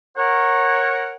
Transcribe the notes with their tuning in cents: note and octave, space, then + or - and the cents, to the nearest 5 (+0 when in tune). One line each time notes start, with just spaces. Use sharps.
A#4 +0 C#5 -20 F#5 +0